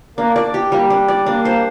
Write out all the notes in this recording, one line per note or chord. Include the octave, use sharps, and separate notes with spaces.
A#3 D4
D5
G4
G3 A#3
D4
D5
A#3 D4
C5